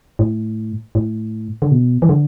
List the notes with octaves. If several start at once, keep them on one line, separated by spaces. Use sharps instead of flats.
A2
A2
D3
B2
E3
D3